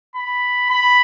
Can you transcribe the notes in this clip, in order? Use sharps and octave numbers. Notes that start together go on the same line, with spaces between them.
B5
B5